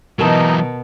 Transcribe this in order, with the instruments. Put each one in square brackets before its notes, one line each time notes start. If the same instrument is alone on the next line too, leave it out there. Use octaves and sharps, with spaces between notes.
[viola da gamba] B2 [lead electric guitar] E3 F#3 [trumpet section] D#4 [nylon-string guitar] A#4 A5